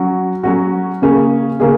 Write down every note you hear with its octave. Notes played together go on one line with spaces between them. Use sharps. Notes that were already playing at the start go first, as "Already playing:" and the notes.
Already playing: F#3 C#4 F#4
F#3 C#4 F#4
C#3 A#3 C#4 G#4
C#3 A#3 C#4 G#4